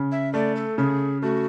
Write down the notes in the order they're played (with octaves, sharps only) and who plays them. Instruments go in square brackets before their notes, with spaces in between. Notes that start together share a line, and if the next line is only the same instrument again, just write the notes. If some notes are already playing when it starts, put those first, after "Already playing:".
Already playing: [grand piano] C#3
[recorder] E5
[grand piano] A3 [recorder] D5
[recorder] A4
[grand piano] C#3 [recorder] G#4
[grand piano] A3 [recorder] F#4